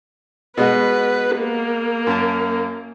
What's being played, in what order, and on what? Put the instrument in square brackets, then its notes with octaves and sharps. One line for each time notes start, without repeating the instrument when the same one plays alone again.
[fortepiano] B2 G#3 F#4 [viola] B4
[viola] A#3
[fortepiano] F#2 A5